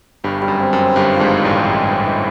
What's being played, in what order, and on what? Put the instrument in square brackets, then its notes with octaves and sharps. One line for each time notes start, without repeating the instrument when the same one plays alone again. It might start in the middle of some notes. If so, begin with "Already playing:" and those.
[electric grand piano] G1 G2 [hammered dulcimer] G3
[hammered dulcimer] G3
[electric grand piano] F#2
[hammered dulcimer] C4
[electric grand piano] F#2
[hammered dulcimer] C4
[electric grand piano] G1 G2 [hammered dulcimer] G3
[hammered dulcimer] F4
[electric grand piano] G#1 G#2
[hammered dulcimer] C4
[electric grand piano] A1 A2
[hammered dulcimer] G3
G#3
E3
E3